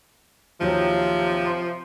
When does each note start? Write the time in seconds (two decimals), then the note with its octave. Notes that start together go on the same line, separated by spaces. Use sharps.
0.61 D#2 C3 F3 F#3
1.46 C6